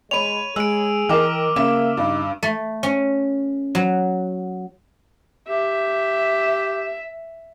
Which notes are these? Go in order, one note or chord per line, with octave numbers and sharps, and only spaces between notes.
G#3 C#5 B5 D#7 F7
G#3 G#4 E6 D7
E3 A#4 D#5 G5 D6 F6
C#3 A#3 E5 E7
G2 D#4
A3
C#4
F#3
G4 E5